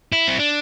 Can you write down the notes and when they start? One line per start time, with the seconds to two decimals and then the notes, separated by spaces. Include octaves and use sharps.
0.12 E4
0.27 C4
0.39 D4